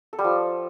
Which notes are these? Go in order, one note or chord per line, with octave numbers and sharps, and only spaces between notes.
A4
G3
F3